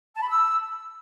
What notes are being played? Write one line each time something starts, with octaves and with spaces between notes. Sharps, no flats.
A5
B5
E6